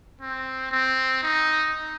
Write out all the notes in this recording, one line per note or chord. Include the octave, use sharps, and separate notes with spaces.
C4
C4
D#4